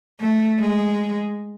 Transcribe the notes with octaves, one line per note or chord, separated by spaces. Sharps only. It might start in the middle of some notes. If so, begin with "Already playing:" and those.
A3
G#3